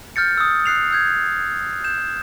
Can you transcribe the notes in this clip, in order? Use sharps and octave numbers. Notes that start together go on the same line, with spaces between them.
F6 G6 A6 C#7
D#6 E6
F#6 C7 F7
E6 G6 G#6
G6 E7